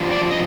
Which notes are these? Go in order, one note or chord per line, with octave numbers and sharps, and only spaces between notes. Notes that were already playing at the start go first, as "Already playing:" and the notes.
Already playing: G2 D3 F3
D4 D5
D#5